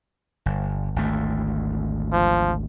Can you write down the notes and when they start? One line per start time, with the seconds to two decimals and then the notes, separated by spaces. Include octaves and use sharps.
0.46 G1
0.96 G#1 D2 A3
2.12 F3